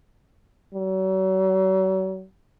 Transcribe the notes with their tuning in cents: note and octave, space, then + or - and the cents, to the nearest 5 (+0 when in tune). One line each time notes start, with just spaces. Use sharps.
F#3 +40